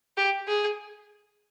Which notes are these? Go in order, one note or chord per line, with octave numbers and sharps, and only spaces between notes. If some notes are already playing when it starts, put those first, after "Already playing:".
G4
G#4